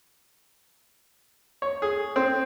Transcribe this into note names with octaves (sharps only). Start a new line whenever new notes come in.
C#5
G#4
C4